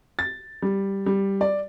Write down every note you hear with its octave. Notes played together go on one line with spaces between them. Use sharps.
A6
G3
G3
D5